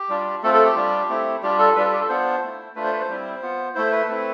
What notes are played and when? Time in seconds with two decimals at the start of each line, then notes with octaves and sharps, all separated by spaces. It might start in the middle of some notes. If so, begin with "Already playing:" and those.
Already playing: G4
0.09 G3 D4 F4
0.43 A3 C4 F4 A4
0.54 A4
0.65 G4
0.76 G3 D4 F4
1.09 A3 C4 E4
1.42 G3 D4 F4 G4
1.59 A4
1.76 G3 D4 F4 B4
1.85 A4
1.93 G4
2.01 A4
2.09 B3 D4 F4 C5
2.43 A3 E4
2.75 A3 D4 F4 B4
2.84 C5
2.93 B4
3.01 C5
3.09 G3 C4 E4
3.42 B3 F4
3.75 A3 E4 C5
3.92 B4
4.09 A3 C4 E4